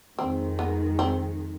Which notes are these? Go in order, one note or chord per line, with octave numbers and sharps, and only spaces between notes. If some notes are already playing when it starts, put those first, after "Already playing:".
F2 D#3 G#3 C4
B3
C4